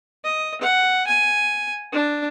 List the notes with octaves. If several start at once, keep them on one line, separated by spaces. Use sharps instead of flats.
D#5
F#5
G#5
D4